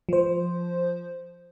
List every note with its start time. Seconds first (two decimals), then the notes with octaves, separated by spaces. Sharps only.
0.09 F3 C5